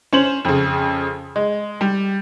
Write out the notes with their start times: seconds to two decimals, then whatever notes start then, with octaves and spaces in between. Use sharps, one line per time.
0.13 C#4 C5 F#7
0.45 F2 C#3
1.36 G#3
1.81 G3